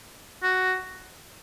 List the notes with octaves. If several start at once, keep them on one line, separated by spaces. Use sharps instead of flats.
F#4